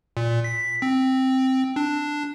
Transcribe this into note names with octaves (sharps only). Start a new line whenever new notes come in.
A#2
B6
C4
D4